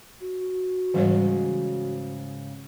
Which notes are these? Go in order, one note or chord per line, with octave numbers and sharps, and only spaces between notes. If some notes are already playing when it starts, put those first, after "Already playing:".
F#4
G#2 C#3 E3 G3 C#5